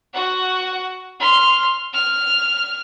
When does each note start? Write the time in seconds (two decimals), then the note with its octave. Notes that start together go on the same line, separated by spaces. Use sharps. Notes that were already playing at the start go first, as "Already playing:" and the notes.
0.14 F#4 F#5
1.20 C6 F6
1.93 F6